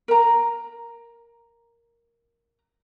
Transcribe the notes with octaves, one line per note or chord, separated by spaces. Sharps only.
A#4 A#5